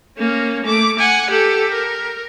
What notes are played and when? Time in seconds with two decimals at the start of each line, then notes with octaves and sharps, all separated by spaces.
0.18 A#3 C#4
0.65 A3 D6
0.99 F#5 G#5
1.30 G4 A4
1.72 A#4